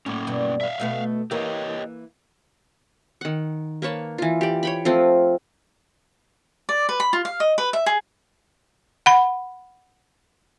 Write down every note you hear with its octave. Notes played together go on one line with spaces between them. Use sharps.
A2 A#3 C#4
G2 B2
E5 F5
B2 A3 B3
E3 A#3 G4 C#5 D#5
D#3 F#5
A#3 B4 C#5 A5
E3 F4
G4 D5
C#5 G5 B5
F3 A3 C4 F4
D5
B4
B5
F4
F5
D#5
B4
E5
G#4
F#5 B5